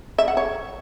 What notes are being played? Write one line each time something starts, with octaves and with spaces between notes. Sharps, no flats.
E5
F#5
C#5